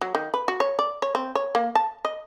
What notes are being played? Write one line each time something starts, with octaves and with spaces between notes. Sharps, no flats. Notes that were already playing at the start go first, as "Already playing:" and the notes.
F#3
D#3
B4
F#4
C#5
D5
C#5
C4
C#5
A#3
A5
D#5